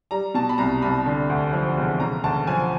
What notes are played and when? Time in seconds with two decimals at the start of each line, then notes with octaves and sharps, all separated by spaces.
0.11 G3 A#5
0.34 B2 A5
0.49 B5
0.58 C2 A#5
0.82 C2 B5
1.06 D3
1.30 D2
1.53 F3
1.77 E1
2.00 C#3 A#5
2.24 D2 A5
2.47 F3 G#5